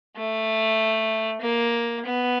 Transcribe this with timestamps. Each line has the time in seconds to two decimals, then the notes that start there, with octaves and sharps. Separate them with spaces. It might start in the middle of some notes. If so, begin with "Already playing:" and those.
0.16 A3
1.42 A#3
2.05 B3